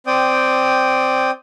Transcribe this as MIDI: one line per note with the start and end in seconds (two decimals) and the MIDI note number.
0.07 1.31 60
0.07 1.31 74
0.07 1.31 79
0.07 1.31 87